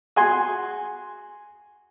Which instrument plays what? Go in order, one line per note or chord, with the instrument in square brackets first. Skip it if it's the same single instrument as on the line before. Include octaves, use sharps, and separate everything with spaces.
[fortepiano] F#4 G#4 G#5 C6